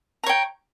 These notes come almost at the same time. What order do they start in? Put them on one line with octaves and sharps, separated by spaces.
A#5 C#5 G5